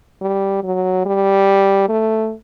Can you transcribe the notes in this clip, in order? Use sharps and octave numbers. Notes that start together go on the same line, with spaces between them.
G3
F#3
G3
A3